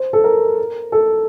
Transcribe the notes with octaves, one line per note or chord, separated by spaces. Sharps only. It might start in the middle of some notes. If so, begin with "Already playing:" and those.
Already playing: C5
A4
A#4
A4